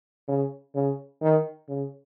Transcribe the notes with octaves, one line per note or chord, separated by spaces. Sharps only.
C#3
C#3
D#3
C#3